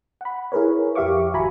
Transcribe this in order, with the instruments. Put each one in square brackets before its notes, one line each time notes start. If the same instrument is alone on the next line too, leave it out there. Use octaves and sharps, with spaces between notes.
[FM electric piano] F#5 B5
E4 G#4 A#4 B4 C#5
F2 G4 E5 F5 C#6 D6
G#1 F#4 G#5 A#5 B5